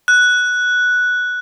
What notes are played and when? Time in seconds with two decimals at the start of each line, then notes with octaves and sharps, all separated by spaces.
0.08 F#6